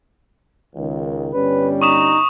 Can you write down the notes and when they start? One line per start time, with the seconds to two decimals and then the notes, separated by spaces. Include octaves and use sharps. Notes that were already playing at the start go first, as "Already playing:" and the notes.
0.76 C#2 D#3
1.33 G1 G3 C#4 B4
1.82 D#4 C#6 D#6 E7